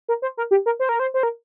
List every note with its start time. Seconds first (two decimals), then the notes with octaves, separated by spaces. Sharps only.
0.09 A#4
0.22 C5
0.37 A#4
0.51 G4
0.66 A#4
0.79 C5
0.89 A#4
0.99 C5
1.14 C5
1.23 A#4